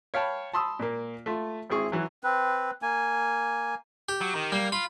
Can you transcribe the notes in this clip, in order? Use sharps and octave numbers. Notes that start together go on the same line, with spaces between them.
C#5 F5 G5 A5 B5
A5 B5 C6 D#6 E6
A#2 A#3
A3 F4
G#1 C4 E4 G#4 C#6
E3 F#3
C4 B4
A#3 G#5
G4
F#3
D#3
G3 A#3
F4 B5